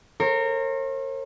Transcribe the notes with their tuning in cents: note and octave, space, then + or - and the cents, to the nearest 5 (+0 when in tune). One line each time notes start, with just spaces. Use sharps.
A#4 -25 C#5 -45